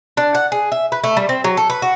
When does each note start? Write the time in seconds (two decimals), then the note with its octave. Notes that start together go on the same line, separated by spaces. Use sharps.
0.17 D4
0.35 F#5
0.52 G#4
0.72 E5
0.92 B4
1.04 A3
1.17 G3
1.29 C4
1.44 F#3
1.57 A4
1.70 B4
1.82 F#4